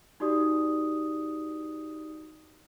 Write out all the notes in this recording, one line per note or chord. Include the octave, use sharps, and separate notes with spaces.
D#4 F#4 G4 D5 D#6